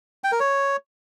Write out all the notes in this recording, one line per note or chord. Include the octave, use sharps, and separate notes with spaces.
G5
A#4
C#5